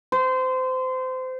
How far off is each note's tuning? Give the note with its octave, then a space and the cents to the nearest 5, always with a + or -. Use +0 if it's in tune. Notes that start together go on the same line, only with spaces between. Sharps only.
C5 -25